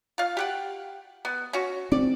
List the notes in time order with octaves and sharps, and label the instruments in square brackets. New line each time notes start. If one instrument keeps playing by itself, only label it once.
[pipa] F4 F5
G4 F#5 G5
B3
C#4 F#4
[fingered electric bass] C4 [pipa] D5